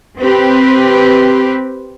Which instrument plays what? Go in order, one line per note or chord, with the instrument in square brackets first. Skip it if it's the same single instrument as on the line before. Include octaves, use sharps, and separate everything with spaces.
[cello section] C4 G4 B4